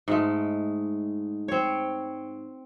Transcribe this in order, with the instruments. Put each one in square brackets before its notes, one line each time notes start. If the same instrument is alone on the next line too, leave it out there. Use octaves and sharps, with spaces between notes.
[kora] G#2 G#3 A3
C4 C#5